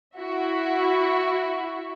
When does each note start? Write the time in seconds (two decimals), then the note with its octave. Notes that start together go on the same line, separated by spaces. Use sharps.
0.17 E4 F#4 E5